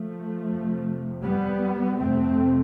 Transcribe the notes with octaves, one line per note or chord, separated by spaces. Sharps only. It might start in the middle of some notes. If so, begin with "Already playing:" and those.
Already playing: F3 A3
F2 C3
G3 B3
F2 C3 A3 C4